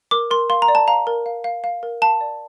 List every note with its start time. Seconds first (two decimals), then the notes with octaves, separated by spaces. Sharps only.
0.11 A#4 D6
0.31 A#4 C6
0.50 F5 C6
0.62 A#5
0.68 D5
0.75 A5
0.88 F5 A#5
1.07 A#4
1.26 F5
1.44 F5
1.64 F5
1.83 A#4
2.02 F5 A5
2.21 D5